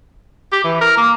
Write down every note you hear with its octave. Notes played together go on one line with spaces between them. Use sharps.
G4
E3
A#4
A#3